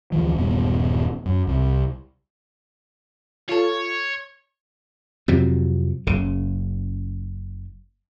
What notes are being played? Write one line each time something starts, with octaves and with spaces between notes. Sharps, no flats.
D2 E3 F3
D#1 G2 B3
F#2
C2
F4 A4 C#5
F2 C3 F#3
F#1 C#3